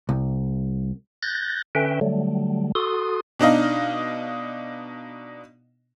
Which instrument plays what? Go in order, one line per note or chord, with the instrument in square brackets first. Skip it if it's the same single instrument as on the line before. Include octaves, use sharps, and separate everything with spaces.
[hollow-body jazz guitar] C2
[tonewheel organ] F#6 G6 A6 A#6
D3 C#4 B4 E5 G5
D3 F#3 G3 A3
F#4 A4 C6 D#6
[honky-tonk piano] B2 D4 D#4 D#5 F5